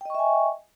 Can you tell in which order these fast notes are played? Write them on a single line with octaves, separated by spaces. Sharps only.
G5 D#5 C#6 E5 G#5